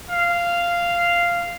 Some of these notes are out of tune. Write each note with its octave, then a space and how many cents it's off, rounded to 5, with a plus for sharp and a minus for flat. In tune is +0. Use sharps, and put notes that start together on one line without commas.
F5 -10